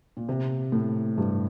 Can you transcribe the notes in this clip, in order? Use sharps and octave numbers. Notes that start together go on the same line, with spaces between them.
A#2
C3
A2
G2